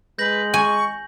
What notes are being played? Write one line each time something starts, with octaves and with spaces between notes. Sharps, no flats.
G#3 B4 G6 A#6 F#7
G#5 C#6